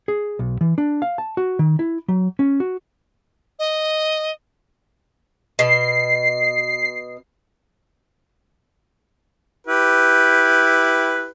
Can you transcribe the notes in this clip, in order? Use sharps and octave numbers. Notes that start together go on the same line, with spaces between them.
G#4
B1
E3
D4
F5
A5
F#4
D#3
E4
F#3
C#4
F#4
D#5
B2 C7
E4 G4 B4